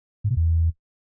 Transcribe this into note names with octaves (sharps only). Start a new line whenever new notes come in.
G#2
B2
E2